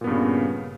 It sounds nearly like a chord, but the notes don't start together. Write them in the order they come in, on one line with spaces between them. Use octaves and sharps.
A#2 B3 G2 C#3